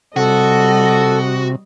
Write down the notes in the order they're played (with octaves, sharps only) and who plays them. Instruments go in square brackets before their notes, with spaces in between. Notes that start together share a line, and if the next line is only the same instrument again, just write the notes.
[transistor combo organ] C3 [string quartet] G3 D#5 [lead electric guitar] F#4 [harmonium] A4